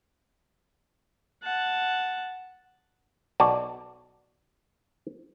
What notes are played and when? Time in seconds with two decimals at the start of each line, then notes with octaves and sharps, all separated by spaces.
1.43 F#5 A5
3.40 B1 F#4 D5 A5